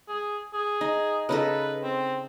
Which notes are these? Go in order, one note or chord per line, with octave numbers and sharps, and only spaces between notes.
G#4
G#4
D#4
C#3 D#4 A4 B4
C4